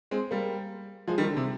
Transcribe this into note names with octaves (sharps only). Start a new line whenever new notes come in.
G#3 C4
G3 A#3
F3 G#3
D#3 G3
D3
C3